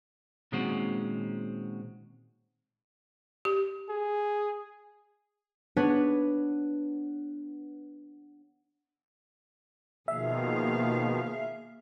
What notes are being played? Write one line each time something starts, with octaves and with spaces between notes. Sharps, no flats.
A#2 D#3 G#3 C4 C#4 F#4
G4
G#4
B3 D4 B4 C#5
B2 D#3 F3 A#3 G#4 E5 F5